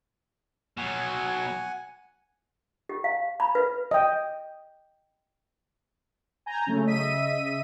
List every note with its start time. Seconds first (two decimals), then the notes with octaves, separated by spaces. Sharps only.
0.77 B2 F#3 F#5 G#5
2.89 G4
3.04 F5
3.40 B5
3.55 B4
3.91 D#5 G5
6.46 G#5 A#5 G6
6.67 C#3 F#3 A3 C#4
6.86 C#3 D#5 E5 B6 D#7